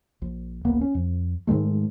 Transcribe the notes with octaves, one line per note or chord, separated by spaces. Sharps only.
A#1
D1 A1 A#3 B3
C#4
F2
G#2 D#3 G#3 A3